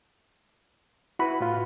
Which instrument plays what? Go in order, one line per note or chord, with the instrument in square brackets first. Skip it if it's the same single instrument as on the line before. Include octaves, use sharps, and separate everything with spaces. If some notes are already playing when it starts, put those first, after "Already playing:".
[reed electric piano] E4 B5 [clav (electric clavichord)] F#4 B4
[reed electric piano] A2 F4